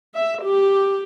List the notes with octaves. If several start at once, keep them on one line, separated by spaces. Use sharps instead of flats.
E5
G4